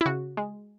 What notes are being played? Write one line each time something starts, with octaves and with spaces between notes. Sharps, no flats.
E4
C#3 F#4
G#3